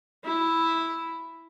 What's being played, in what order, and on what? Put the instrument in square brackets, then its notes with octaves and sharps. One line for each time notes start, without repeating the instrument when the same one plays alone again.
[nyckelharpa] E4